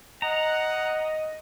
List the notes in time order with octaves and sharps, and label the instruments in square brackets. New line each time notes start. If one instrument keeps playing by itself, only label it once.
[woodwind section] D#5 [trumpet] F#5 [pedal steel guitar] A#5